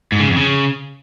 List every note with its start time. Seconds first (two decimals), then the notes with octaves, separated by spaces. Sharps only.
0.12 G#2
0.20 C#3
0.28 F2
0.36 C#3